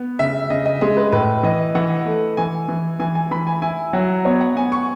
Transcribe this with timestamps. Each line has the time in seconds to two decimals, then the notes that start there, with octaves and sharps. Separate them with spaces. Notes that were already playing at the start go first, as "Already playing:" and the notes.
Already playing: B3
0.19 C#3 E5
0.50 C#3 D#5
0.66 D#5
0.81 G#3 D#5
0.97 B4
1.12 A2 B4
1.43 E3 D#5
1.75 E3 F#5
2.06 A3
2.37 E3 G#5
2.68 E3
2.99 E3 G#5
3.15 G#5
3.31 E3 B5
3.47 G#5
3.62 E4 G#5
3.93 F#3 F#5
4.25 B3 C#5
4.40 F#5
4.56 B3 G#5
4.72 C#6